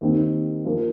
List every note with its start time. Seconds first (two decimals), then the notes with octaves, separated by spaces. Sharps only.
0.01 D#2 D#3 C4 D#4
0.65 F3 A#3 F4